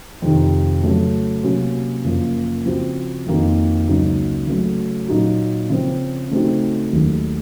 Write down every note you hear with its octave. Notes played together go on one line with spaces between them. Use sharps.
F2 C3 D#3
C#3 F#3 A3
C3 F#3 A#3 C#4 F#4
F#2 C#3 F3 A#3
C#3 F3 C4 F#4
F2 D#3 A#3 D#4 F#4
C#2 C#3 F#3 A#3 D#4
C#3 F#3 A3
A#2 F#3 A#3 D#4 F#4
C#3 F3 C4
C#3 A3 C4 D#4 F#4
D#2 D#3 F#3 A3